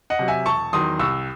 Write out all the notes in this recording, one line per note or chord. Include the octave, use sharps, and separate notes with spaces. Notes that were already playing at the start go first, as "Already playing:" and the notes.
D#5 F#5
C3 F#3
E5 G#5
E1 A5 C#6
E2 D#3 F#3 C6 D#6
C2 C#6 E6